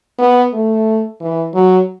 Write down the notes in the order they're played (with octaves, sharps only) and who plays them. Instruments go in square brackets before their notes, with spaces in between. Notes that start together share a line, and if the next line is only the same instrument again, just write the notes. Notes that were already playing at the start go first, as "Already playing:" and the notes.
[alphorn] B3
A3
E3
F#3